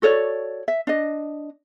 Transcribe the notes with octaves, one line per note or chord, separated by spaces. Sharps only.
F#4 A4 C#5 D5
E5
D4 D#5